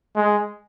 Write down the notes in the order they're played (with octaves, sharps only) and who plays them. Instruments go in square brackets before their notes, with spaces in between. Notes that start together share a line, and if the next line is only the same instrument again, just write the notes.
[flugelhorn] G#3